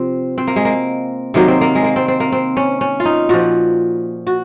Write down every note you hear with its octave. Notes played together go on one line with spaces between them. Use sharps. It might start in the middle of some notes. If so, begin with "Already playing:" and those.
Already playing: C3 F3 C4
C4
A#3
G#3
A#3
C3 D#3 F#3 A#3
C4
A#3
G#3
A#3
C4
C4
A#3
C4
C#4
C#4
F4
D#4
A#2 F3 F#4
F#4